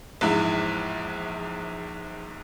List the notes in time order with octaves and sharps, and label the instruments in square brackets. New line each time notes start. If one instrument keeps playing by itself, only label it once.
[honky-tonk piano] A#1 E2 G#2 E4